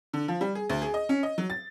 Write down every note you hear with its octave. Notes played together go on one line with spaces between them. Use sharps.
D3
F3
G3
G#4
D2
G#4
D#5
C#4
D#5
F#3
A6